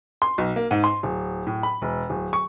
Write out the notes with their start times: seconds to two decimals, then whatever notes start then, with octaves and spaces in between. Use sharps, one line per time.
0.22 C6
0.38 B1
0.56 A#3
0.71 G#2
0.84 C6
1.03 D1
1.47 A2
1.63 B5
1.82 E1
2.10 D1
2.33 C#6